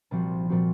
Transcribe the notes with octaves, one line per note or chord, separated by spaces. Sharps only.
C2 A#2 F3 C4 F#4
A#2 F3 C4 F#4